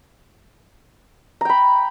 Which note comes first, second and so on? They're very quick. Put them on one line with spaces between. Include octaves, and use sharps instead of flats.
A#5 G5 B5